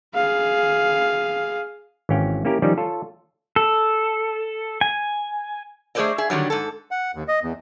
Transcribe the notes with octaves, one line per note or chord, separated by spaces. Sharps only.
G#4 F5
G#1 E3 C#4 F5 G5
A#3 C#4 E4 G4 A#4
D#3 F3 G3 C#4 D#4 D5
F4 A4 C#5
A4
G#5
A3 G#4 B4 C5 D5 D#5
G#4 E5
D3 D#3 F#3 G3
G#2 A4
F#5
D#2
D#5
E2